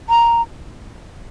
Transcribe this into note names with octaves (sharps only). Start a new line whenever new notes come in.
A#5